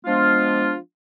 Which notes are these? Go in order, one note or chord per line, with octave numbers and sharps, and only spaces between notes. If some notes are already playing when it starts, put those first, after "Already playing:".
F3 G#3 B3 D4 F4